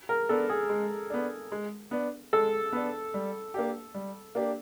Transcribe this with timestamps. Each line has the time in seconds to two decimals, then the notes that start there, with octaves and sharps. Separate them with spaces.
0.09 A#4
0.29 B3 D4 A4
0.50 G#4
0.69 G#3
1.10 B3 D4
1.52 G#3
1.91 B3 D4
2.33 G#3 A4
2.73 B3 D4
3.14 G3
3.54 A#3 D4 G4
3.94 G3
4.35 A#3 D4 G4